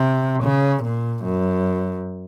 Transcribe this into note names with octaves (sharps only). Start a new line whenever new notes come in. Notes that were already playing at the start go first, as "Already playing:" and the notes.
Already playing: C3
C#3
A#2
F#2